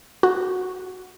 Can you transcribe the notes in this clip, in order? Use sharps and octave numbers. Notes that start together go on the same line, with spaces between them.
F#4